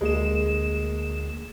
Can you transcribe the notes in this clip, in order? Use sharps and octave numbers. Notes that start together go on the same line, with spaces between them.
D2 G#3 A#3 E7